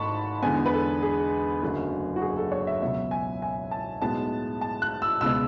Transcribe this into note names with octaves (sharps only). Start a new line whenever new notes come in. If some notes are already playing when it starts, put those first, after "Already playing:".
Already playing: G#1 G#2 A3 A5 B5 C#6
E2 D3 G#3 B3 G#5
B4
A4
G#4
F#1 F#2 D3 F#3 A3
F#4
G#4
A4
C#5
E5
C#2 B2 F#3 B3 E5
G#5
G#5
A5
B1 A2 G#3 B3 A5
A5
F#6
E6
C#2 B2 G#3 B3 E6